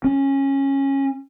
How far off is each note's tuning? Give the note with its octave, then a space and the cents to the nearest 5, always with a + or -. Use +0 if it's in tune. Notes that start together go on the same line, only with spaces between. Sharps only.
C#4 -15